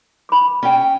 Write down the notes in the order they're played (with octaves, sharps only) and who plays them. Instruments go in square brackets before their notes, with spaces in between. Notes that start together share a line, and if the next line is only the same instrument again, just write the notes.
[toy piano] B5 D6
[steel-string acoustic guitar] C#4 G5